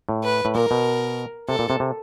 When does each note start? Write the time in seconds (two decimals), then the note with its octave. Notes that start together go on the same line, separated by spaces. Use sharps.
0.09 A2
0.24 B4
0.45 A2
0.55 A#2 A#4
0.71 B2
1.49 C3 A4
1.59 A#2
1.70 C3
1.80 C3